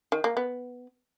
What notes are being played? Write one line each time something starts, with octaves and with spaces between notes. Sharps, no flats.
D#3
A#3
B3